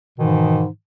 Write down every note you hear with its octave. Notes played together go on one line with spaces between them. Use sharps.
G#2 B2 D#3 E3